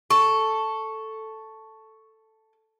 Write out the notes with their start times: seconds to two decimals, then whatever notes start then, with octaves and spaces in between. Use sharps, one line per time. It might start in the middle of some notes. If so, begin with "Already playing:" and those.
0.10 A4 C#6